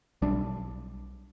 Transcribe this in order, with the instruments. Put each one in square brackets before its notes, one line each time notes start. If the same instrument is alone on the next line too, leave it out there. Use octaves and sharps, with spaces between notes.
[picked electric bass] B1 G3 D4